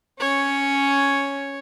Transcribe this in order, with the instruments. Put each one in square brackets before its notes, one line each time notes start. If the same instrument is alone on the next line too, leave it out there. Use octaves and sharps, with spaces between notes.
[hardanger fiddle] C#4 [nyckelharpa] C#5